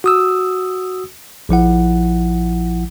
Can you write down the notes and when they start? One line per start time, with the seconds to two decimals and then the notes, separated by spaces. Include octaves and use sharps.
0.04 F#4 D#6 E6
1.49 A#1 F3 E4 F#5